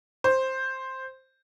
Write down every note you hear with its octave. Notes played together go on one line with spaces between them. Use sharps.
C5